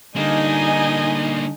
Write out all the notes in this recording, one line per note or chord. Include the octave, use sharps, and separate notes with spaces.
D3 G3 A#3 D4 D#4 D#5 G#5